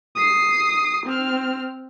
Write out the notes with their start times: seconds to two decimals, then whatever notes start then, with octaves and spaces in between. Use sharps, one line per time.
0.16 D#6 C7
1.06 C4 F6